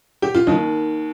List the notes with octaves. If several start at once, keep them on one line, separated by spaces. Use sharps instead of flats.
G4
F4
D#2 D#3 D#4